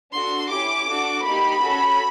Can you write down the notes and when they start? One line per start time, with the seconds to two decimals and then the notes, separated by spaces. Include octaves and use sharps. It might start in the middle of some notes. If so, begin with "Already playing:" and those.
0.13 D4 F#4 A4 C6
0.50 C#4 E4 G4 D6
0.87 D4 F#4 A4
1.25 A#3 D#4 G4 B5
1.61 C#4 F#4 A4